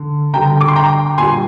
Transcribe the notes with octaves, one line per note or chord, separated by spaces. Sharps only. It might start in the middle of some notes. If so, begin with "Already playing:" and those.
Already playing: D3
D3 G3 G5 A#5
D6
C6
G5 A#5
A#2 G3 G#5 C6